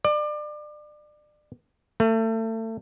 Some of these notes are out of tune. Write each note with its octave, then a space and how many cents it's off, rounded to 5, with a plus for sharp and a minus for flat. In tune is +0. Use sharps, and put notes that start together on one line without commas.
D5 +30
A3 +30